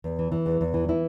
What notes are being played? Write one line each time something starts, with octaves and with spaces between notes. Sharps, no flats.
E2
E3
E3
E2
E2
E3
E3 E4